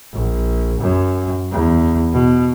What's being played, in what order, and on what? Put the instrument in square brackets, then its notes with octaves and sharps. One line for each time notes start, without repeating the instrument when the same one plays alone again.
[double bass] A#1
F#2
E2
B2